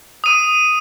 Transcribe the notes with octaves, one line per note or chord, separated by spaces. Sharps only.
D#6 D#7